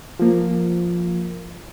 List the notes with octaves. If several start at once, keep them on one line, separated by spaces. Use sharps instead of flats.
F3 A#3